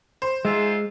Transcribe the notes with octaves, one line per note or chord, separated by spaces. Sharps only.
C5
G#2 G#3 F4 E5